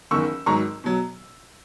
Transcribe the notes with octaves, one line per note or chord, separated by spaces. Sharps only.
F#1 E2 D#3 C#6 E6
G#1 G#2 F#3 A#5 C#6
B2 F#3